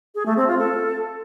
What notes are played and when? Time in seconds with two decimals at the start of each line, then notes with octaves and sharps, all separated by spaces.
0.15 G#4
0.26 A3
0.37 C4
0.48 F4
0.59 A4